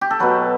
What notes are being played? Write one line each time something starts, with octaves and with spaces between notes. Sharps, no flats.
G4
A4
B2 F#3 B4